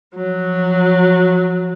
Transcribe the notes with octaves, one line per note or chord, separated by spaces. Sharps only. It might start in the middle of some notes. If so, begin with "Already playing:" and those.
F3 F#3